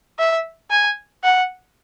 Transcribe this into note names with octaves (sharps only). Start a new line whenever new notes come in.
E5
G#5
F#5